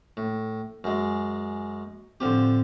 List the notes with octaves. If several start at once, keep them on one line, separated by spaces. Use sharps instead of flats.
A2
F#2 G#3
A2 D3 F3 C4 G4